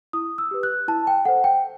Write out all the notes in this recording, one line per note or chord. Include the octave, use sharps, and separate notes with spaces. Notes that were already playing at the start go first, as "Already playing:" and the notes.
E4 D#6
E6
G4 B4
F#6
E4 A5
G5
A4 C5 F#5
G5